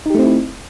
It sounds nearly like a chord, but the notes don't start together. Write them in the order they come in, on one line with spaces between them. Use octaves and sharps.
D#4 G4 A3 C4 E4